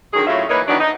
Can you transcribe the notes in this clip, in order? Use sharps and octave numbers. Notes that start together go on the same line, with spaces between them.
D3 D#3 F#3 G#4
A2 F#3 C#4 F4 E5
E3 A#3 D#4 A#4 B4 C#5
D#3 E3 F#3 B3 D4
D#4